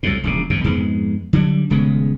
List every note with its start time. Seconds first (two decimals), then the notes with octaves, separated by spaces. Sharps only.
0.03 C2 F2 A2
0.24 E1 A#1 C#3
0.50 G#1 F#2 B2
0.64 F2 G#2 G#3 B3
1.33 D3 F#3 G3
1.70 D#1 C#3 G#3 B3